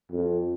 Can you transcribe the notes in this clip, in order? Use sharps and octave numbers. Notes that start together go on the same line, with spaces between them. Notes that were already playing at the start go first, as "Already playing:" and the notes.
F2